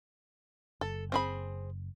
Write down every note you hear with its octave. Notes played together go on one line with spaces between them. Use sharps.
F#1 A4
C4 G#4 B5